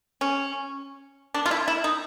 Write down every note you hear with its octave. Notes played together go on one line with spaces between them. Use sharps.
C#4
D4
F4
E4
E4
D#4